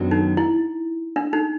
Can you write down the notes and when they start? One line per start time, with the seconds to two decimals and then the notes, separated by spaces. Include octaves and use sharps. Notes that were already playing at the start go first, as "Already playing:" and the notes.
Already playing: F#2 D#3 F#3 B3 D4
0.11 D#4
0.37 E4
1.16 D4
1.33 D#4